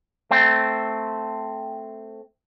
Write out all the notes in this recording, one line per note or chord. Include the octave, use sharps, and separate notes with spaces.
A3 C4